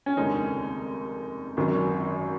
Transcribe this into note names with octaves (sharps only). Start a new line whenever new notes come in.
C#4
F1 D#2 C#3 G#3 D#4
G#1 F#2 D#3